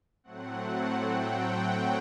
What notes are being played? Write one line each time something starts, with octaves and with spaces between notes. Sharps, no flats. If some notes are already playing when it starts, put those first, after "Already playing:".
A2 F#3 A3 C4 F#5
G5